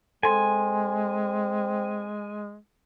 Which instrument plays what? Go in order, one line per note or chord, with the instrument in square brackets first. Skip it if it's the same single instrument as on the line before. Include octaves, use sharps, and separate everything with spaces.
[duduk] G#3 [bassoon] C4 [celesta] A4 C6 [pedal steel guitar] G#5